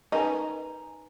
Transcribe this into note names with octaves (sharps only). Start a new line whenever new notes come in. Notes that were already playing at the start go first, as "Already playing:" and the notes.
C#4 D#4 A#4 B4 D#5 G#5 A#5